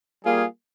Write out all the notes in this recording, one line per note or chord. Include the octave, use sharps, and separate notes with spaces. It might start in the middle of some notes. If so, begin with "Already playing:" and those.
G3 A#3 F4 G#4